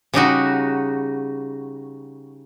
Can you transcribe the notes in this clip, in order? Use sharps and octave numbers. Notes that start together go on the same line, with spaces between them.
C#3 G3 D#4 F#4